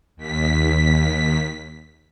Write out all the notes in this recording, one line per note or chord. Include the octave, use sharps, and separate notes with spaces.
D#2 B6